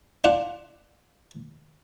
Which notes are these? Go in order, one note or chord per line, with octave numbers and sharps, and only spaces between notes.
D4 F4 F#5